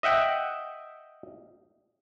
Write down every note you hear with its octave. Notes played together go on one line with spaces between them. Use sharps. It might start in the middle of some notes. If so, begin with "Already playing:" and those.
D#5 E5 F#5 G5